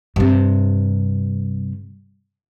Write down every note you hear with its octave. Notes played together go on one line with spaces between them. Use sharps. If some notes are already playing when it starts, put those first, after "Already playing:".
G2 C3